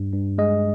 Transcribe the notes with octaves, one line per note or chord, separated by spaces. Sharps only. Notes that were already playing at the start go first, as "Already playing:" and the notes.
Already playing: G2
G2
G#3 D#5